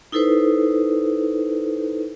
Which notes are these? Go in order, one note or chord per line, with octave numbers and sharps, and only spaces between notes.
D#4 E4 A4 B4 C5